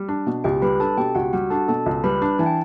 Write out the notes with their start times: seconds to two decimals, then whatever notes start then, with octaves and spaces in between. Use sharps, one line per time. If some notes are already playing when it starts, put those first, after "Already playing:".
Already playing: G3
0.09 D4
0.27 B2
0.44 C#2 G4 G5
0.62 G3 B4 B5
0.80 D4 A4 A5
0.98 B2 G4 G5
1.15 C#2 F#4 F#5
1.33 G3 F#4 F#5
1.50 D4 A4 A5
1.68 B2 A4 A5
1.86 C#2
2.04 G3 B4 B5
2.22 D4
2.39 E3 A5
2.46 G5